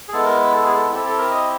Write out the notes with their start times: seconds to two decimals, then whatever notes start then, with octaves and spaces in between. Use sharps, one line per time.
0.08 G#4
0.13 G#3 B3 E4 A4
0.25 A#4
0.53 A4
0.64 G#4
0.74 A4
0.92 C4 E4 G4 A4
1.05 A4
1.18 A#4
1.31 D#5